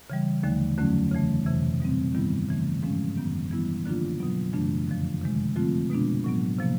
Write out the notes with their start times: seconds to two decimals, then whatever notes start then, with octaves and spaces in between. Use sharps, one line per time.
0.10 C#3 E3 G3
0.43 D#2 D3 F3 A3
0.78 F2 D3 F#3 A3 C#4
1.12 C#3 E3 A3
1.46 F2 C3 E3
1.80 B2 G3 C4
2.15 G2 D#3 G3 B3 E4
2.49 C#3 E3 A3
2.83 G#2 F3 G#3 C#4
3.17 F#2 D#3 F#3 B3
3.51 E3 G3 B3 E4
3.86 D3 F3 A#3 D4 F4
4.20 B2 F#3 B3
4.53 F#2 C#3 E3 A3 D4
4.88 F2 D3 F3
5.21 C3 D#3 G#3
5.56 D3 F3 A3 C4 F4
5.90 B2 G#3 B3 D4
6.24 A2 F#3 B3
6.59 C3 F3 A#3